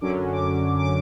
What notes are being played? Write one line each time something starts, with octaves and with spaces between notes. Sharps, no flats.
F#2 D3 F#3 C#4 D6
D6
D6